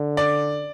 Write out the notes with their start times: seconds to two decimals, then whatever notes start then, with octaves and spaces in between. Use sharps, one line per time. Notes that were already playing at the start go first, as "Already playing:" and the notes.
Already playing: D3
0.17 D5